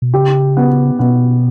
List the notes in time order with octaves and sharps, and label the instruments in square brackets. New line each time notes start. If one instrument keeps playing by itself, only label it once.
[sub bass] B2
[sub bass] C#3 [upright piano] G4
[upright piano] B3
[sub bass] B2 [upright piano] B3